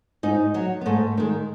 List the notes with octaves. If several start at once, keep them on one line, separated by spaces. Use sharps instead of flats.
G#2 D#4
F#3
B3
G#2 A3
D#3 G#3